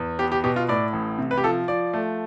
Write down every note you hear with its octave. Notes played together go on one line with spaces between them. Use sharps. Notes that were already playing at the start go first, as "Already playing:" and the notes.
Already playing: E2
B3 G4
G4
B2 G4
F4
A2 D5
A1
C3
B4
G4
F3 A4
F3 D5
A3